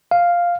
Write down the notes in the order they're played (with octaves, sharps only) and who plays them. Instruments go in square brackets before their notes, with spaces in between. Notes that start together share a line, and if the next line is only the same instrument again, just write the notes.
[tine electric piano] F5